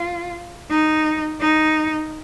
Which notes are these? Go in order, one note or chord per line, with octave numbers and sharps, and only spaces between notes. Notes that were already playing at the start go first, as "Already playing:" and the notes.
Already playing: F4
D#4
D#4